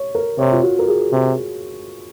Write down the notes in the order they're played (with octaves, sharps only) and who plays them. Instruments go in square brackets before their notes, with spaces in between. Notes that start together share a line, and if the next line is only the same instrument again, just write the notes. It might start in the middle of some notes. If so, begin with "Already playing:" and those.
Already playing: [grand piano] C#5
A#4
[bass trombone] C3 [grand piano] C#5
[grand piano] F4
F#4
A#4
G#4
[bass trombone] C3